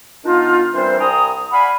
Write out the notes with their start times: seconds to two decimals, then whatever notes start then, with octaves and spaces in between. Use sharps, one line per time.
0.25 D#3 B3 D4 D#4 F4
0.74 E3 G3 C4 D4 A#4 C5
1.00 C2 G5 G#5 A#5 D#6
1.52 D5 F5 F#5 G#5 B5